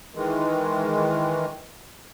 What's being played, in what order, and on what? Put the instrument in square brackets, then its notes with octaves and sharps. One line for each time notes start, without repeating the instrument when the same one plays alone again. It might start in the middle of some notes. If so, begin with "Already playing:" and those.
[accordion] D#3 E3 G#3